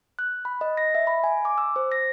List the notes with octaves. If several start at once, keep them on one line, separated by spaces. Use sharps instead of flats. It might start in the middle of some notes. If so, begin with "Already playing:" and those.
F#6
B5
D#5
A#6
E5
B5
G#5
D6
E6
C5
A#6